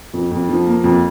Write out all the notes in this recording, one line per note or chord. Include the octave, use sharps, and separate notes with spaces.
F2
F2
F3
A#3
F2